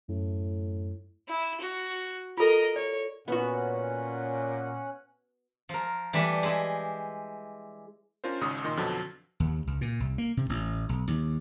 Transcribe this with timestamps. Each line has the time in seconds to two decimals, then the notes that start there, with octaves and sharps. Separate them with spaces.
0.09 F#2 A2
1.28 E4
1.61 F#4
2.38 F4 A4 A#4 D#5
2.76 C#5 D5
3.28 A#2 B3 C#4 F#4 F#5
5.69 F3 A#4
6.13 E3 G3 A3 D4
6.43 G#3 E4 G4
8.24 C#4 D4 F4 A#4 C5
8.41 G#1 G#2 C#3 D#6 E6
8.64 A#2 D#3 D#5 C6
8.77 F2 B2 D3 F3 F#3
9.40 D#2
9.67 C#2
9.81 A#2
10.00 C2
10.18 A#3
10.37 C3
10.49 A1
10.89 B1
11.08 D#2